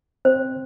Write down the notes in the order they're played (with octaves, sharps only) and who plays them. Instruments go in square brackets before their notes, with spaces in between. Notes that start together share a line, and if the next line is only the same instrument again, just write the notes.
[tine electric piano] C4 [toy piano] C5